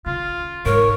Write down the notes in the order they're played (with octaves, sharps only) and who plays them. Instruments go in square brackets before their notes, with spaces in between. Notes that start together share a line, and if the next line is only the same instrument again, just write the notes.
[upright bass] C#3 [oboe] F4
[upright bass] G#2 [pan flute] A#4 [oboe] C#5